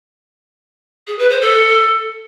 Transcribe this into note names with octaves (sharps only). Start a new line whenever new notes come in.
G#4
B4
C5
A4